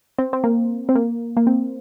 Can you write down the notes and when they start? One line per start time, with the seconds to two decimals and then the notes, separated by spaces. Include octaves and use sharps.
0.18 C4
0.33 C4
0.44 A#3
0.89 C4
0.95 A#3
1.37 A#3
1.47 C4